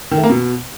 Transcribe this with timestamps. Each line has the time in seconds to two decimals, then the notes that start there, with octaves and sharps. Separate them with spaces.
0.11 D#3
0.17 A3
0.23 A#3
0.30 B2